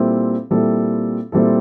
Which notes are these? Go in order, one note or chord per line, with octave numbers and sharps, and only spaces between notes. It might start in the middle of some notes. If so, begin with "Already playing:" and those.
Already playing: A#2 G3 C4 E4 A4
A#2 G3 C4 E4 A4
A#2 G3 C4 E4 A4